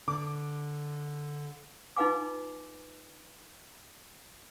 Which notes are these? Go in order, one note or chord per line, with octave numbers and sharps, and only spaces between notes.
D3 D6
D#4 F4 B4 F5 G#5 D6